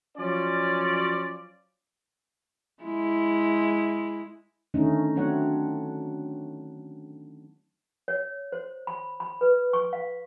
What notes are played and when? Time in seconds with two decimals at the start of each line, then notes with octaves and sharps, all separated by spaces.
0.17 F3 F#3 C#4 F4 C#5 D5
2.83 G#3 E4
4.74 D3 D#3 A3 C#4 D#4
5.16 F#3 A3 C4 D4 C#5 F#5
8.08 C#5
8.52 C5
8.87 B5
9.20 B5
9.41 B4
9.73 C#6
9.93 F5